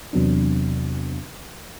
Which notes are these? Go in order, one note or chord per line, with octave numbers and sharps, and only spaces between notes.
E2 C3 F#3 B3 D4